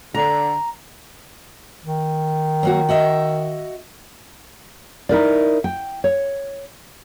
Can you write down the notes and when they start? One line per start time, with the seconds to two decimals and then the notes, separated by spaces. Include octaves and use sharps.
0.14 D3 A#5
1.83 D#3
2.63 F#3 A#3 F#4
2.89 F#4 D#5 E5
5.09 D#4 E4 A#4 D5
5.64 G5
6.04 C#5